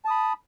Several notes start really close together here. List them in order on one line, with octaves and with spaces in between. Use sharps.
A5 D#6 B5